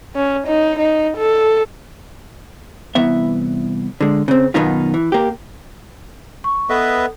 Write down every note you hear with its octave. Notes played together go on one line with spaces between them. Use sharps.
C#4
D#4
D#4
A4
C2 E3 B3 E5
D3 G#3
C#3 C4
F#2 B2 D#3 B3 D#4 F4
E3
A#3 G4
C#6
B3 A4 B4 D#5 E5